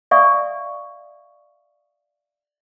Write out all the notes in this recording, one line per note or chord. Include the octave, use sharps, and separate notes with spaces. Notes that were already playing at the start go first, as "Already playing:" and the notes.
D5 E5 F5 G#5 C#6 D#6